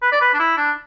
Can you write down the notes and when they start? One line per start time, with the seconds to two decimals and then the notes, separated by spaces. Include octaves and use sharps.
0.02 B4
0.12 D5
0.21 B4
0.34 D4
0.39 E4
0.57 D4